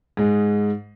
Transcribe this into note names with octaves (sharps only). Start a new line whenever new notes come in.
G#2 G#3